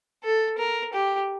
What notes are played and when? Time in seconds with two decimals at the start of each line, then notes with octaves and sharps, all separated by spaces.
0.24 A4
0.58 A#4
0.93 G4